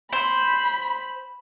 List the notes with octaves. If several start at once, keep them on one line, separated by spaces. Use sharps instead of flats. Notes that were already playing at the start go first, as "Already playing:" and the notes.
C5 B5